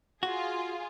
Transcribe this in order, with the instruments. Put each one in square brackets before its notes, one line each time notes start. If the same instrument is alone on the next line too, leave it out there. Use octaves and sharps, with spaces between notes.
[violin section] F4 G#4 [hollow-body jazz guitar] F#4